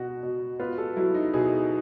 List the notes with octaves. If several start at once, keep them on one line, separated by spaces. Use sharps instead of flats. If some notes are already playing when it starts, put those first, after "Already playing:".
Already playing: B2 F#4
B2
B3 F4
A4
F#3 E4
D#4
B2 G#4